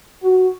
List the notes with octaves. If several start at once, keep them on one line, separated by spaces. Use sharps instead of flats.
F#4